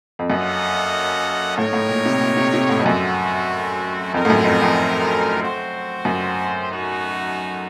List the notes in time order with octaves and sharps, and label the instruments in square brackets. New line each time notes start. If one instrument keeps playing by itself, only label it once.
[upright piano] F2
[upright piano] F#2 [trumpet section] A#3 C#4 A4 D#5 F#5
[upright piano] A2 [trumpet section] D#4 A#4 C#5
[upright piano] A2
A#2
C3
A#2
C3
C3
A2
F2
[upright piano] F#2 [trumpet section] A3 C4 F#4
[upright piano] F2 [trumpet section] C4 D#4 A#4
[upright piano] A2
F#2
F2
F2
[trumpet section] C4 F#4 C5
[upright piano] F#2
[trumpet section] A3 D#4 F#4